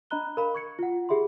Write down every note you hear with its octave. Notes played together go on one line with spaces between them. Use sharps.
D4 D#5 A#5 B5 F#6 G7
A#4 F5 B5
C#6 G#6 C#7
F4 F#5
G4 G#4 E5 B5 C6